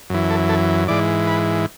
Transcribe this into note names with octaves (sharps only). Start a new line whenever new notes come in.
F#2 E3
A4
A4
G#2 E3 D5
B4